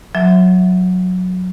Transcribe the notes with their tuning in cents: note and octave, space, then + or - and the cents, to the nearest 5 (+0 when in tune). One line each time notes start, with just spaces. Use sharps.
F#3 -15 E5 +0